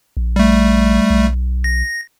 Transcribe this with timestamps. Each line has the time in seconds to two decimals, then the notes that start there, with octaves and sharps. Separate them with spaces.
0.17 A#1
0.36 G3 A3
1.10 B1
1.64 A#6